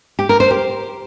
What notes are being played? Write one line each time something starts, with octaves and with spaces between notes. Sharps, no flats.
G4
A#4
C5
G4